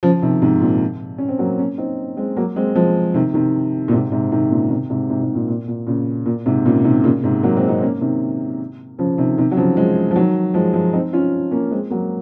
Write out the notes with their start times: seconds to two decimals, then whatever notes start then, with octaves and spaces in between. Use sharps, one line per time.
0.03 C#3 F3
0.22 C3 D#3
0.42 G#2 C3
0.61 A#2
1.18 C#4
1.29 C4
1.39 F#3 A#3
1.59 A#3 C#4
1.78 C4 D#4
2.17 G#3 C4
2.37 F#3 A#3
2.56 G#3 C4
2.75 F3 G#3
3.14 C3 D#3
3.34 C3 D#3
3.88 A#2
3.92 G#2 C3
4.11 G#2 C3
4.32 C3 D#3
4.50 A#2 C#3
4.70 C3 D#3
4.90 G#2 C3
5.10 G#2 C3
5.22 G#2 C3
5.35 A#2
5.48 A#2
5.68 A#2
5.87 A#2 C#3
6.26 A#2
6.46 G#2 C3
6.66 A#2 C#3
6.84 C3 D#3
7.04 A#2 C#3
7.23 G#2 C3
7.43 F#3 A#3
7.56 G#3 C4
7.68 C4 D#4
7.82 A#3 C#4
8.01 C3 D#3
8.99 C#3 F3
9.18 C3 D#3
9.38 C3 D#3
9.51 F#3
9.57 C#3 F3
9.77 F3 G#3
10.11 F3
10.16 D#3 F#3
10.54 F3 G#3
10.74 F3 G#3
10.93 C4 D#4
11.13 C#4 F4
11.51 A#3 C#4
11.71 G#3 C4
11.90 F#3 A#3